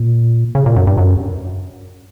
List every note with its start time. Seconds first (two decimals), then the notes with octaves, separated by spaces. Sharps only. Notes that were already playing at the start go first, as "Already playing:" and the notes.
Already playing: A#2
0.55 C#3
0.66 A#2
0.76 F#2
0.87 G2
0.98 F#2